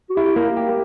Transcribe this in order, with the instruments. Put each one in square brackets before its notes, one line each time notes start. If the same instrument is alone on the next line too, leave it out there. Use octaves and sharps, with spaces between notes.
[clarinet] F#4
[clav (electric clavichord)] E4 [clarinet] G4
[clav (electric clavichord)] A#3
G4